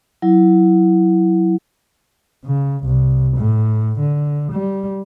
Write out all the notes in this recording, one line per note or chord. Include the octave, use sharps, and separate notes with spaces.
F#3 E4
C#3
C2
A2
D3
G3